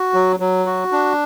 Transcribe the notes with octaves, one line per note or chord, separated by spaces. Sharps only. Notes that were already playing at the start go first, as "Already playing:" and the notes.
Already playing: F#4
F#3
F#3
F#4
D4